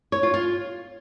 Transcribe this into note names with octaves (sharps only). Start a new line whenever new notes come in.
C#5
F4
F4